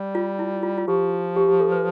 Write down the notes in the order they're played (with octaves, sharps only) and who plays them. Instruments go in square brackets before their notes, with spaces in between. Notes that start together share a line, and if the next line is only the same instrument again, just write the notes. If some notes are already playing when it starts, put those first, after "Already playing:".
Already playing: [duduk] G3
[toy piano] F4
E4
F4
F4
[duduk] F3 [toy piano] G4
[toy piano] G4
G4
A4
B4